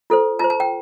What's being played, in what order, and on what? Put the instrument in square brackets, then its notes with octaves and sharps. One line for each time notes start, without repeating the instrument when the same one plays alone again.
[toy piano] F4 A4 C5
F4 C5 A5
A5
G5